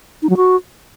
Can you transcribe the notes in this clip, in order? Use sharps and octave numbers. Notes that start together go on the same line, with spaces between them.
D#4
F#3
F#4